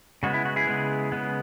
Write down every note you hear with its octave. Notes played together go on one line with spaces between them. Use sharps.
C#3 G#3 B3 F#4
E4
F#4
E4 G#4
C#3 G#3 B3
C#3 G#3 B3